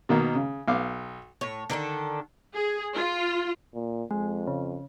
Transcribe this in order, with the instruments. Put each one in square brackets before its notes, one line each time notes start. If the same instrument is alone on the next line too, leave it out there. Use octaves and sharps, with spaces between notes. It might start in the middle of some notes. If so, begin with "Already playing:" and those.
[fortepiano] B2 D#3 A#3
C#3
B1 F5 D6
[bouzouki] A2 C#5
D3 D#3 D4 A4
[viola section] G#4
F4
[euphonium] A#2
[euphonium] F2 [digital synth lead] G#3
[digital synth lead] C#3